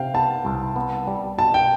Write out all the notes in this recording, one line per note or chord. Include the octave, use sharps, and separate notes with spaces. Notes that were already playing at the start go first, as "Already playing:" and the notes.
Already playing: C3 F5 G5
B3 A5
C2
B3
G3
B2 A5
G5